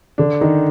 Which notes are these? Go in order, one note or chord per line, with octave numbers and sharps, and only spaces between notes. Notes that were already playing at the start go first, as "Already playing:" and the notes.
D3 D4
D#3 D#4